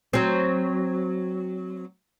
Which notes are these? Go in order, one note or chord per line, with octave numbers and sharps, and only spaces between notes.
F#3 C4